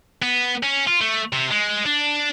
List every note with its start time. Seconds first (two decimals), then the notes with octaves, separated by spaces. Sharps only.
0.22 B3
0.63 C#4
0.87 F4
1.01 A3
1.33 C3
1.51 G#3
1.86 D4